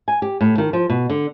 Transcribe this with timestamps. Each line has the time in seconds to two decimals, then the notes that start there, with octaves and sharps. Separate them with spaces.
0.08 G#5
0.22 G4
0.41 A2
0.58 D#3
0.73 F3
0.90 B2
1.10 D3